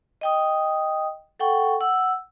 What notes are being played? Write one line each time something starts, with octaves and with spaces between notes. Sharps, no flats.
D#5 G5 D#6
A4 F#5 G5 C#6
F#5 E6